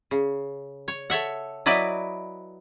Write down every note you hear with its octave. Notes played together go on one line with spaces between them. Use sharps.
C#3
C#5
A4 C#5 E5 F#5
F#3 E4 B4 D5 D#5